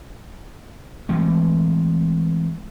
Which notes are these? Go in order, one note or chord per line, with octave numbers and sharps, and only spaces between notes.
E3 G#3 A3 C4